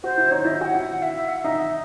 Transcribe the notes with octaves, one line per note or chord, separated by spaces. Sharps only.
F#4 C5
E4
D#4 C#5
E4 D#5
F#4 F#5 G#5
E4
F#5
E5
E5
F#5
F#5
D#4 E5